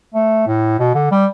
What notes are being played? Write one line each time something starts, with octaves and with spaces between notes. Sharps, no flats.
A3
A2
B2
D3
G3